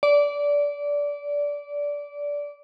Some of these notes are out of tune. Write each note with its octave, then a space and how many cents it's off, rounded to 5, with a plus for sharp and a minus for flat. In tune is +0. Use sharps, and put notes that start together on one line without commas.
D5 -20